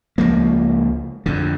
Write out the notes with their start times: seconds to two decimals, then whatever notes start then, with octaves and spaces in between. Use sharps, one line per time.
0.18 C#2 F3 A#3
1.26 F2 D3